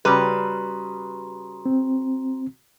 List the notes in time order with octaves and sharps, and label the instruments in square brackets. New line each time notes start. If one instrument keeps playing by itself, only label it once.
[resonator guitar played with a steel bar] C#3 B4 [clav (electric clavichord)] G3 [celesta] F#4 A#5 C6
[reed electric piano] C4